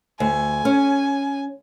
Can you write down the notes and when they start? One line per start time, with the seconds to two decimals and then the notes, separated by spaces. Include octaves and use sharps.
0.20 D2 G#5
0.65 C#4